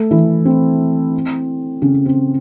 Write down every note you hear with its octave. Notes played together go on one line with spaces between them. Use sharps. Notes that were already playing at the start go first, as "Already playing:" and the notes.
Already playing: A3 A4
E3 E4
C4
C#3 C#4
C4